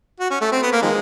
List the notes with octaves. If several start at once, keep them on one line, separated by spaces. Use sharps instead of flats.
F#4
C#4
A3
C4
B3
A#3
D#3 F3 G#3